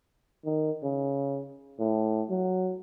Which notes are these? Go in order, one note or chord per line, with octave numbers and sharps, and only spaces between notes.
D#3
C#3
A2
F#3